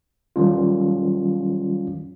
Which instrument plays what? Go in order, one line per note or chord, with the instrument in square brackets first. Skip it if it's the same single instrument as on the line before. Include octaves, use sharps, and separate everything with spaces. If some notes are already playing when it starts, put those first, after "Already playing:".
[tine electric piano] D#3 F#3 G3 C#4 F4